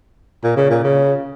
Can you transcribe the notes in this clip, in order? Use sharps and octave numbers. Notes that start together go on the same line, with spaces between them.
A#2
C#3
A#2
C#3